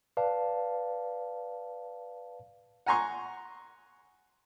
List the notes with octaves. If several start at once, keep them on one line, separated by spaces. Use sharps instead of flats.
B4 D5 F5 A5
F#5 G#5 A#5 C6 C#6